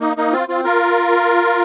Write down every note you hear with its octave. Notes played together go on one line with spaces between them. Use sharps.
A#3 D#4
A#3 D#4
C4 F4
C4 F4
F4 A#4